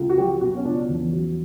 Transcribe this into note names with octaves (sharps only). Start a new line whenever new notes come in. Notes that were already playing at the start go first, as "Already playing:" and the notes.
Already playing: C#2
F#4
F#3 G4
B2 F#4
C#4
C#2 D4
E2
F#3